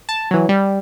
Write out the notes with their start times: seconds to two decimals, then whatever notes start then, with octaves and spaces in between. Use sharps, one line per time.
0.09 A5
0.31 E3 F#3
0.49 G3